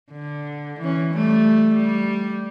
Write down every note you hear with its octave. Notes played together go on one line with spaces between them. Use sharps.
D3
E3 C#4
G3 A3
G3